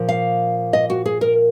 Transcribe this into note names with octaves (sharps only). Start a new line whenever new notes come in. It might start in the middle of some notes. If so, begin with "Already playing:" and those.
Already playing: A#2 F3 A#3
F5
D#5
F#4
G#4
A#4